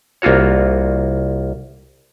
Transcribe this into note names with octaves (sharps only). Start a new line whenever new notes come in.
C2 A#3 F4 F#4 C#5